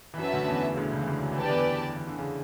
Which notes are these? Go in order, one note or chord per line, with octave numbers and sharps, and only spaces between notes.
E3
F#2 F#3 C#4 F#4 B4 E5 A5
D2 D3
E2 E3
C#3
D2 D3
C#2 C#3
E3
D2 D3
F#3
E3
D3 G4 B4 D5 A5
E2 E3
E3
D3
C#3